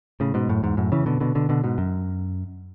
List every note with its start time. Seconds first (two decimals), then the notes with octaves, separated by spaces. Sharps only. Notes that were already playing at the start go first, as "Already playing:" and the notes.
0.20 A2 C#3
0.34 G#2 B2
0.49 F#2 A2
0.63 E2 G#2
0.77 F#2 A2
0.92 C#3 E3
1.06 B2 D3
1.20 B2 D3
1.35 B2 D3
1.49 B2 D3
1.64 G#2 B2
1.78 F#2